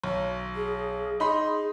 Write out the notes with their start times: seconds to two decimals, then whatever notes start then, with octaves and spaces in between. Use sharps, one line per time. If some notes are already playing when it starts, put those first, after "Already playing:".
0.04 B1
0.55 G#4
1.20 D#4 G#4 B5 C6